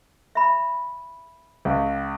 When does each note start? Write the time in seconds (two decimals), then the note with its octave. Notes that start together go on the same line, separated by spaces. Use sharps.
0.35 E5 B5
1.65 C#2